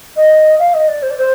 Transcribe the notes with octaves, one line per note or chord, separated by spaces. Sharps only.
D#5
F5
D#5
D5
C5
D5
C5